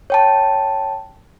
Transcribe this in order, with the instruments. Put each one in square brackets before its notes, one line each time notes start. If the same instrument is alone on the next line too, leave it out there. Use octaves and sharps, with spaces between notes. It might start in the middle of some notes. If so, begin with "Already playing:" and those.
[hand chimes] C#5 G5 A5